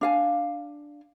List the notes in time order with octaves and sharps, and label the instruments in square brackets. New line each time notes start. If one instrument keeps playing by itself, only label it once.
[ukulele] D4 F5 G#5